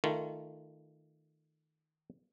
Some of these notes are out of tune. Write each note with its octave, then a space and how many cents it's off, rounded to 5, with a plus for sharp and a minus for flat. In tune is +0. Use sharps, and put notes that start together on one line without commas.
D#3 +0 A3 +0 F4 -20